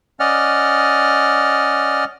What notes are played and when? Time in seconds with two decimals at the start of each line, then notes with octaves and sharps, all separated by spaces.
0.20 C#4 D5 D#5 F#5 F6